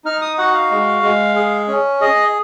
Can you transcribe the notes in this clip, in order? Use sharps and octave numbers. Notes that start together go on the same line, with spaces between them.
D#4 F6
D#6
F#4 F#5
F5
G#3
G#3
G#4
C#4
G#4 D#5